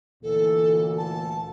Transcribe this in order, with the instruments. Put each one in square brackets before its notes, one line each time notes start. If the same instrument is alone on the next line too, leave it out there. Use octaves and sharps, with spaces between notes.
[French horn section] D2 A#2 E3 [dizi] A4
[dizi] A5